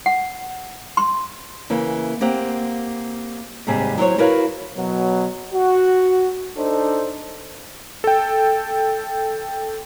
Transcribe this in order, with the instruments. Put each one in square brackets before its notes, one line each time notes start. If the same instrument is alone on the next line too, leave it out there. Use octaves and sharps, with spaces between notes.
[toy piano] F#5
C6
[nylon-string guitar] C#3 E3 A#3
A#3 C4 G4 F#5
D#2 G#2 C3 G3 G#4
F#3 E4 C5 C#5
E4 F#4 A#4 B4 C#5 F5
[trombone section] B2 F#3
F#4
D4 D#4 A4 C5
[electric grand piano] A4 G5